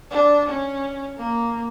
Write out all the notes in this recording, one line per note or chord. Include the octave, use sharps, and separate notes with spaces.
D4
C#4
A#3